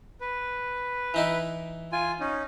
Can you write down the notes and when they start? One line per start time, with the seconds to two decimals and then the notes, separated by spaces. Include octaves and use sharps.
0.21 B4
1.14 E3 D#4 E4
1.92 F4 G#5
2.20 C#4 D#4